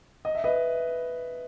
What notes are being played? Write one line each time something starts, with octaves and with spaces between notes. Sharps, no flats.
D#5
E5
B4 D#5